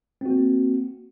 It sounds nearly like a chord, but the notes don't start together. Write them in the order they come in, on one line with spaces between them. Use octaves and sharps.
C4 F#4 A#3